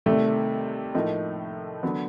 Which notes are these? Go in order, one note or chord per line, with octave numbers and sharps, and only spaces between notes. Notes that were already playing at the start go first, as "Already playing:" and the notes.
C3 D#3 G3 A3
A2 F3 A#3 D#4
D3 F#3 B3